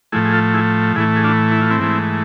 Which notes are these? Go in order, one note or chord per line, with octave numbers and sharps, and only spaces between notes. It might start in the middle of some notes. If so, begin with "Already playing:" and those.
A2 F3 A3 E4 G#4
G#4
F4 A4
E4 G#4
A2 E3 A3 E4 G#4
G#4
D4 F4
E4
F4
C4 E4
G#2 E3 A3